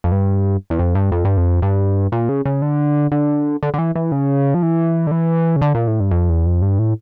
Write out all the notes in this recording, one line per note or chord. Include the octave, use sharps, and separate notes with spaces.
F2
G2
E2
F2
G2
F2
G2
F2
G2
A#2
C#3
C#3
D3
D3
D3
D3
E3
E3
C#3
F3
E3
D3
E3
C#3
D3
A#2
A2
G2
F2
E2
F2
G2
A2